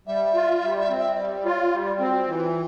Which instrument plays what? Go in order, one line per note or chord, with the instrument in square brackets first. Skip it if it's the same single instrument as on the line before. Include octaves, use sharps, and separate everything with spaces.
[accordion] G3 [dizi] E5
[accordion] F4
G3
C4
[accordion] G3 [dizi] D5
[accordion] F4 [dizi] C#5
[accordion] G3
[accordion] C4 [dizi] F#4 G#4
[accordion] E3 [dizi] F4